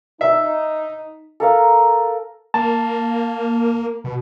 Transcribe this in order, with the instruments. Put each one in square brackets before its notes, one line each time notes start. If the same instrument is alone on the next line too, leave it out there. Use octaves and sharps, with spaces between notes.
[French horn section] D#4 [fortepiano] E5
[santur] A4 A#4 F5
[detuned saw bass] A#3 [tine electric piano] A5
[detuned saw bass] B2